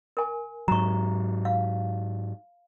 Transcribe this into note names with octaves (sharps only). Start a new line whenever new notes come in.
A#4 G#5
G#2 F#3 A#5 C#6
F5